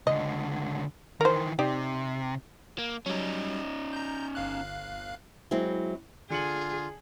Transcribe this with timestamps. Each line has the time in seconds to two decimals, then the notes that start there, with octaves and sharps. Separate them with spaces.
0.07 C#2 D3 D#5
1.21 D#3 E3 A#4 C5
1.59 C3 D#4 G4 D5
2.78 A#3
3.06 F#3 G3 C#4 D#4
3.93 A#5 G6
4.35 G1 F5 F#6
5.51 F#3 G#3 C4 E4
6.30 D3 F4 G#4 C#7 F#7